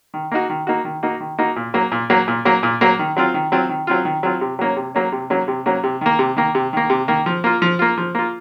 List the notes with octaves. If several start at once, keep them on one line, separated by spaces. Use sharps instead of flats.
D#3
A#3 D#4 F#4
D#3
A#3 D#4 F#4
D#3
A#3 D#4 F#4
D#3
A#3 D#4 F#4
A#2
F#3 A#3
A#2
F#3 A#3
A#2
F#3 A#3
A#2
F#3 A#3
D#3
F#3 C4 F4
D#3
F#3 C4 F4
D#3
F#3 C4 F4
D#3
F#3 C4 F4
C3
F#3 A#3 C#4
C3
F#3 A#3 C#4
C3
F#3 A#3 C#4
C3
F#3 A#3 C#4
C3
D#3 A#3
C3
D#3 A#3
C3
D#3 A#3
C3
D#3 A#3
F3
A#3 F4
F3
A#3 F4
F3
A#3 F4